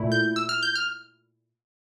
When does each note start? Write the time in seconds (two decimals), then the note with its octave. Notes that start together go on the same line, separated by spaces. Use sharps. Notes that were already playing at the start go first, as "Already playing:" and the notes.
Already playing: A#2 A3 E4
0.12 G6
0.36 E6
0.49 F6
0.63 G6
0.75 F6